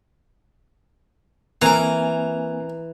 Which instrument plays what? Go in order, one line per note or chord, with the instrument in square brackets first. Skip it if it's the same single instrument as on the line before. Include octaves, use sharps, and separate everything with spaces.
[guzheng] E3 [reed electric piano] A#3 C4 G#5 [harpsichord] A#4 A#5